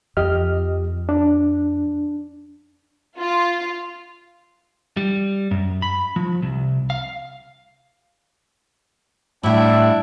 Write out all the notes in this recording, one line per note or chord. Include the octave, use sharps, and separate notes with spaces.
F2 G4 D#5 F6
D4
F4
G3
F#2
B5
F3
C2
F5
A2 G3 D4 E4 F#5